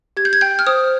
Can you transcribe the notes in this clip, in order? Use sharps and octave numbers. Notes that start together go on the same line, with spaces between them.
G4 G#6
G6
G#6
G5 G6
F6
C5 D#6